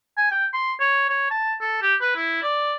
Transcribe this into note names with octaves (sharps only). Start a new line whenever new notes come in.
G#5
G5
C6
C#5
C#5
A5
A4
G4
B4
E4
D5